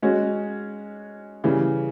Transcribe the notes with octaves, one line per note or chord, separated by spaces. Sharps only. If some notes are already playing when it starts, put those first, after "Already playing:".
G#3 C#4 F#4
C#3 E3 G3